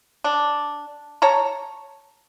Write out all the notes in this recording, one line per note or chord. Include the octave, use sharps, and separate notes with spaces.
D4
C#5 A5 A#5